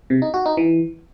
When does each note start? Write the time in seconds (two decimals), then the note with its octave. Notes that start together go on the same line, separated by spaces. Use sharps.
0.10 C3
0.22 D#4
0.34 F#4
0.46 D#4
0.57 E3